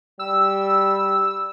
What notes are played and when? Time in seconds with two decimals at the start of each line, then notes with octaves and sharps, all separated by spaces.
0.19 G3 E6